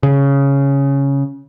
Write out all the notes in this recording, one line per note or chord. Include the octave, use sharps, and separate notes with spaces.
C#3